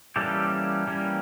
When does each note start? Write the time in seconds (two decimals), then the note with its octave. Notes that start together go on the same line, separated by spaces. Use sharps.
0.16 E3 G3 A#3 C#4 G4 A4
0.87 E3 G3 A#3 C#4